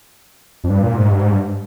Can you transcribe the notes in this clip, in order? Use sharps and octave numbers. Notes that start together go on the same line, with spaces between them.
F2
G2
A#2
G#2
G2
G#2
G2